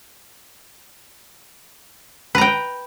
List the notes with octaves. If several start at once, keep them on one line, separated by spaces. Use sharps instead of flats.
B4 G5 A#5